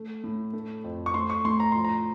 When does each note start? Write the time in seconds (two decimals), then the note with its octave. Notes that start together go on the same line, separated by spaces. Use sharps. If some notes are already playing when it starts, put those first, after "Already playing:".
Already playing: A3
0.24 A2
0.53 A3
0.84 F2
1.06 C#6
1.14 A3 C6
1.30 C#6
1.45 A2 C6
1.60 A#5
1.72 F3 C6
1.84 A#5